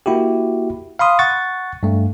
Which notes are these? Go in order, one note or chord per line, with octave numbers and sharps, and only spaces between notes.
A#3 E4 F#4 G4
F5 B5 C6 D#6
F#5 C#6 A6
G2 A3